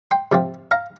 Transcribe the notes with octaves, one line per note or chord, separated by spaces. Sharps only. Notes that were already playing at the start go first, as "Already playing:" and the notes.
G5 C6
C3 F3 C4
F5 A#5